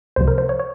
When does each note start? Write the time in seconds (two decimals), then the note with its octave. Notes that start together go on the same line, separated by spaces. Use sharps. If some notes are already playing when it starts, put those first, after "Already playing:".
0.16 C#2 C3 F3 C5
0.28 A#4
0.38 C5
0.49 C#5
0.60 C#5